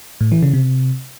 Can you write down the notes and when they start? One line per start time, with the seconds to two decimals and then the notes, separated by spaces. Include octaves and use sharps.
0.21 A2
0.32 E3
0.43 C#3
0.54 C3